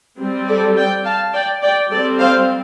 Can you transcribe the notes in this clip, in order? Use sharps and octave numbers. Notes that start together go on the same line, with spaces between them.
G3 C4
A4 D5
D5 G5
F5 A5
D5 G5
D5 G5
G3 C4 A4 D5
C5 F5